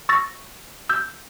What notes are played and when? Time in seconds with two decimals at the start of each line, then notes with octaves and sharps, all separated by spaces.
0.09 C#6 E6 A6 A#6
0.89 E6 G6